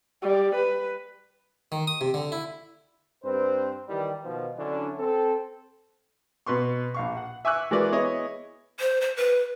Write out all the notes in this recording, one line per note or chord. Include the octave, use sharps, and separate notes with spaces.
G3
B4
D#3
D#6
C3
D3
E4
G2 C4 B4 C5
D#3 E3 G3
B2 D#3 F3
D3 F#3 C#4 D4 E4
C4 A4
B2 B4 C6 C#6
A#1 F5 C#6
F#5
E5 G#5 C#6 D6 E6 F#6
E3 G#3 F#4 A#4 B4 D5
B3 E4 G#4 C#5 D#5
C5
C5
B4